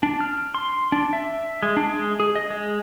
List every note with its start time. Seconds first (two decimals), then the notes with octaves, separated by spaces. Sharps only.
0.03 D4
0.20 F6
0.54 C6
0.92 D4
1.13 E5
1.63 G#3
1.77 D4
1.89 G#3
2.20 G#4
2.35 D#5
2.50 G#3